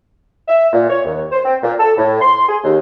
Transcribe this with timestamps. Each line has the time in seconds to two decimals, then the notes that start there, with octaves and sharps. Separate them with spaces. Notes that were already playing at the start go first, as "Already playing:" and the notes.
0.48 E5
0.73 A#2
0.90 C#5
1.05 D#2
1.32 C5
1.45 C4
1.63 A#2
1.80 A4
1.98 A2
2.21 C6
2.49 G#4
2.64 D#2